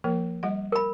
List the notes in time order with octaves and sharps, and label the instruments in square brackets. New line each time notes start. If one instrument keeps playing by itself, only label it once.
[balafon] F3 A#3 A#4
G3 D#5 F#5
[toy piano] A#4 B5